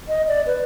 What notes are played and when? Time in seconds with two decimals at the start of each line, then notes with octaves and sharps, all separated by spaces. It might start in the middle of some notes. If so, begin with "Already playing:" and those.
0.09 D#5
0.28 D5
0.47 B4